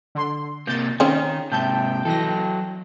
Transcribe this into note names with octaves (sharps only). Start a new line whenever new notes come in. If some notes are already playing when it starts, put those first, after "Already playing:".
D3 C6
C3 A#3 G6 A6
D#3 C4 C#4 F4
G#2 C3 E5 G5 A5 G6
E3 F#3 A4 A#6